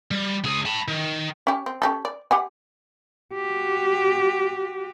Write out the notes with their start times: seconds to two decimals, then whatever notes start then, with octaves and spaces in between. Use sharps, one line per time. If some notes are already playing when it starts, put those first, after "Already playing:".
0.11 G3
0.44 C#2 G#4
0.66 A5 B5
0.88 D#3
1.47 C#4 G4
1.66 C4
1.82 C#4 G4 A4
2.05 D5
2.31 G4 F#5 G#5
3.34 F#4 G4